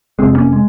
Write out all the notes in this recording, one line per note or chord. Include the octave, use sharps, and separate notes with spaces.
F1 F2 C3 G#3 C4
A#3 C#4
G#3